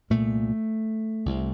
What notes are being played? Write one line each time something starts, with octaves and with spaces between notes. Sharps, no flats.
C2 A#2 A3
C2 C3